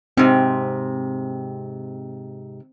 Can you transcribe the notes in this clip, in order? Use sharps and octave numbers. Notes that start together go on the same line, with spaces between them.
G#2 C3 C4